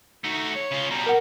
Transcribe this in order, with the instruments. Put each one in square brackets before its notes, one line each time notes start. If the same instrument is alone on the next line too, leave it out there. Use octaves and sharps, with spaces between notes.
[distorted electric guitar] A3 F#4 [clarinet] D#4
[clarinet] C#5
[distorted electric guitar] C#3 F4
[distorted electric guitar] B2 G3 [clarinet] A#5
[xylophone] A#4 F#5